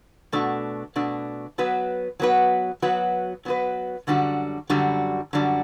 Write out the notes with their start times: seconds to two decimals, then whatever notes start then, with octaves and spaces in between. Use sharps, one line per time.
0.32 B2 A3 D4 F#4
0.96 B2 A3 D4 F#4
1.58 F#3 B3 F#4 B4
2.20 F#3 B3 F#4 B4
2.82 F#3 B3 F#4 B4
3.45 F#3 B3 F#4 B4
4.07 F#2 D3 G3 D4 F#4
4.70 F#2 D3 G3 D4 F#4
5.33 F#2 D3 G3 D4 F#4